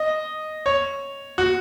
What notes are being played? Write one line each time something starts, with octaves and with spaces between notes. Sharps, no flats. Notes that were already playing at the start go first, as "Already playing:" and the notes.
Already playing: D#5
C#5
F#4